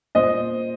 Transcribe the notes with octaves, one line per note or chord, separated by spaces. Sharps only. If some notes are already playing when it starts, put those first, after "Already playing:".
A#2 C5 D#5